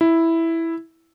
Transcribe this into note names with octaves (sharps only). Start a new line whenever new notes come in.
E4